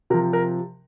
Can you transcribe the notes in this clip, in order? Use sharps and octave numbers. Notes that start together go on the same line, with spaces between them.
C3 F3 A#4
A#4